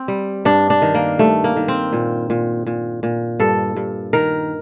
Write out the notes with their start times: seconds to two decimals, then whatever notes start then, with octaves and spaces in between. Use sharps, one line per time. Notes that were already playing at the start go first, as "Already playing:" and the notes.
Already playing: C4
0.08 G3
0.45 G2 D4
0.70 D4
0.82 D#3
0.95 A#3
1.19 G2 A3
1.44 A#3
1.56 D#3
1.68 C4
1.93 A#2
2.30 A#2
2.67 A#2
3.03 A#2
3.40 G2 A4
3.76 G2
4.13 D#3 A#4